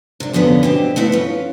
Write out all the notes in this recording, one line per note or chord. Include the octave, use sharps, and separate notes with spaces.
C3 D4
F2 A#2 D3 B3 C#4
B2 C4 G4
A3 B3 C4 E4
C#4 F4